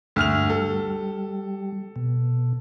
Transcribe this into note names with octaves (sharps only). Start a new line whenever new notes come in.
D2 G2 F6 F7
G3 A4
B2